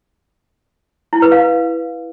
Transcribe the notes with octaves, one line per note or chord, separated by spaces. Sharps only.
E4
B4
F5